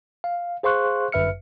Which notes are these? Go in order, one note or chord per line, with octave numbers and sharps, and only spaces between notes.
F5
G#4 C5 F5 C6 C#6 F#6
G1 F#2 B4 E5 F6 C#7